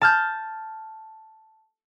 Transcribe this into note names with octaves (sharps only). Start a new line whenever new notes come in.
A5 F6 G6